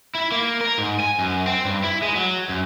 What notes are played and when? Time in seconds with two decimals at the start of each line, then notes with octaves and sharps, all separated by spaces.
0.15 E4
0.32 A#3
0.61 A#4
0.78 G#2
1.00 G#5
1.19 F#2
1.47 C4
1.65 G2
1.83 E4
2.02 G#3
2.16 F#3
2.49 F#2